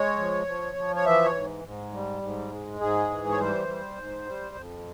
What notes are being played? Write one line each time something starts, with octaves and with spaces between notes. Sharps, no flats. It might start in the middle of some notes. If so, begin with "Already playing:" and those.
Already playing: G#3 C#5
F3
F3
F3
C#5
E3 E5
C#5
G#2
G#2
G3
G#2
G#3
G#2 G#4
E3
C#5
G3 C5
G3
G#2
G3
F2